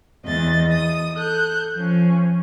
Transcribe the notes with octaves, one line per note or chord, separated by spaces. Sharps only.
E2 D#5 A6
D#6
A4 F#6 G6
F3 C#4